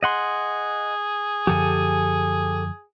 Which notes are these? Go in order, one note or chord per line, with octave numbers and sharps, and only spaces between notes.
G#4 D#5 F#5 C6
F#2 D3 F3 G4 A4 G#5